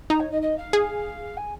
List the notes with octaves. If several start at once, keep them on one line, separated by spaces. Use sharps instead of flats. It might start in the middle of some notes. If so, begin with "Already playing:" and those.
D#4 A#5
C#5
D#5
D#5
F5
G#4
G#5